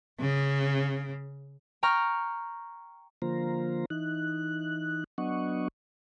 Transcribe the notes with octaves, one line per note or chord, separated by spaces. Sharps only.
C#3
G5 A#5 C#6 F6
D3 F3 A#3 F4 C5 A#5
E3 D#4 F#6
F#3 B3 D4 D#5 F#5 C#6